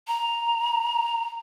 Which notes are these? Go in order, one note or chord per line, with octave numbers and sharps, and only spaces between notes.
A#5